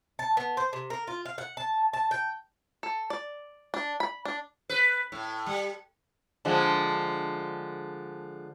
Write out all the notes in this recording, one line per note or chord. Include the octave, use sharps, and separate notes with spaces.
A5
B3
C5
C3
A#4
F4
F5
F#5
A5
A5
G5
A4
D5
D4
B5
D4
B4
A2
G3
D3 F3 G#3